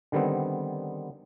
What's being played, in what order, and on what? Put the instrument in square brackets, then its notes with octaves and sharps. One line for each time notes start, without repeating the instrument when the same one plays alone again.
[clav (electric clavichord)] D3 D#3 G3 B3 C4